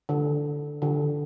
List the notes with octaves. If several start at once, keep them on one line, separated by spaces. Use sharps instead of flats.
D3
D3